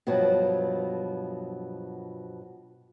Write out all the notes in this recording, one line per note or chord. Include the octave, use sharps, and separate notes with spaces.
G2 B2 F3 F#3